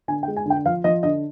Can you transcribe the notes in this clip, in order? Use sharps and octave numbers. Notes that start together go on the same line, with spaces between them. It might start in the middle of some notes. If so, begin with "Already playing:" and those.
D3 G#5
G5
G#3
G#5
D3 G5
F3 F5
F3 D#5
D3 D#5